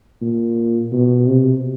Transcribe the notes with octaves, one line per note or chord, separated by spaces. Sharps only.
A#2
B2
C3